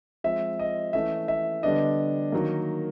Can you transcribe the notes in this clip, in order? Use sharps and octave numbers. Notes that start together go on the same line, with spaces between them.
F3 G#3 C4 E5
D#5
E3 A3 C#4 E5
E5
D3 G3 B3 D4 D#5
D#3 F#3 A#3